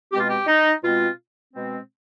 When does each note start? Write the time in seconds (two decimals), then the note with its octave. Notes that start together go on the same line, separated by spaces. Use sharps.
0.11 B2 G#3 C4 G4
0.20 F4
0.29 G4
0.46 D#4
0.82 B2 G#3 C4 F4
1.53 B2 G#3 C4